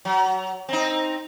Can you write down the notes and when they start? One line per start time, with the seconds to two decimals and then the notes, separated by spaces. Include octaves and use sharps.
0.05 F#3
0.69 C4 D#4